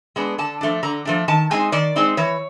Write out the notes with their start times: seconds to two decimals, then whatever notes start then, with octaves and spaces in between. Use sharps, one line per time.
0.16 G#3 B3 D4
0.38 D3 A5
0.61 F3 A3 D4
0.83 D3 A#5
1.05 F3 A3 D4
1.28 D#3 A5
1.51 G#3 C4 D#4 G#5
1.72 D#3 D5
1.96 G#3 C4 D#4
2.17 E3 C#5